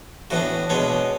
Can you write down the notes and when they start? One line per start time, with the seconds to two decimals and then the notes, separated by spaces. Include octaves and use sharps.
0.30 A2 E3 B3 D4 F#4
0.70 B2 G#3 B3 D4 C#5